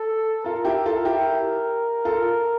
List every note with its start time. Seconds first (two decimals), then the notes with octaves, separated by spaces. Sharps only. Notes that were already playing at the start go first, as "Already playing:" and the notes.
Already playing: A4
0.45 F4 A4 A#4
0.65 E4 G4
0.86 F4 A4
1.05 E4 G4
2.05 F4 A4